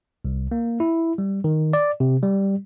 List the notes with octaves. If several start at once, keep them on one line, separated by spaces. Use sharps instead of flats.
C2
A#3
E4
G3
D#3
D5
C3
G3